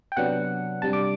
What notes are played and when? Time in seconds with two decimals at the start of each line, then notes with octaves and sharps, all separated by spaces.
0.12 G5
0.17 C3 F#3 B3 D4 F#5
0.82 C3 G3 D4 A5
0.93 D6